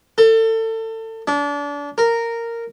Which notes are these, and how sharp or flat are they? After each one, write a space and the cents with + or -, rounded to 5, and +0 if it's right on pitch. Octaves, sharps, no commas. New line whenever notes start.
A4 +30
D4 -30
A#4 -10